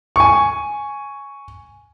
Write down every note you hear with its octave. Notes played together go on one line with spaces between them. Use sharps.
G#5 C#6